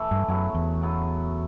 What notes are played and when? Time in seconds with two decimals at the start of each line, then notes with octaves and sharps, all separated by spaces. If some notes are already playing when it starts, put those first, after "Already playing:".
Already playing: E3 A3 E4 A4
0.11 G2
0.28 F#2 C#3 F#3 B3 E4
0.54 E2
0.82 C#3 F#3 B3 E4